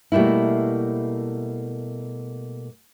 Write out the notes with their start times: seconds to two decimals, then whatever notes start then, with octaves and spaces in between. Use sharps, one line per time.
0.12 B2 G3 A3 A#3 E4